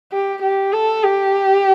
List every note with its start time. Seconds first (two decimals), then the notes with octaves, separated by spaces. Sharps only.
0.12 G4
0.42 G4
0.73 A4
1.04 G4